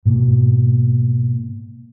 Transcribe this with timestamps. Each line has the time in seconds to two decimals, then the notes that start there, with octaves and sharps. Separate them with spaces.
0.05 G#2 B2 A#3